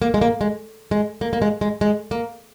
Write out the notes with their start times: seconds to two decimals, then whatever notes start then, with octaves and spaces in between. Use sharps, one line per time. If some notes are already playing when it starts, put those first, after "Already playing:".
0.02 A#3
0.14 G#3
0.21 A#3
0.41 G#3
0.91 G#3
1.21 A#3
1.33 A#3
1.42 G#3
1.61 G#3
1.81 G#3
2.11 A#3